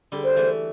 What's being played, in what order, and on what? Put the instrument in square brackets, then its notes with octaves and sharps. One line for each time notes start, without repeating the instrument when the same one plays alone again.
[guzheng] D3 G3
[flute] C5
[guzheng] E3 A3